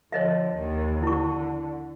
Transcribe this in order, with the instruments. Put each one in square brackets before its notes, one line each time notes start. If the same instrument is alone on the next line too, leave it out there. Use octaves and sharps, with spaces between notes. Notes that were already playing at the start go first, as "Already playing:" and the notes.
[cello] D3 F3 [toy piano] C#5 D#5 E5
[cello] D#2 D#3
[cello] D3 [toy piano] E4 C#6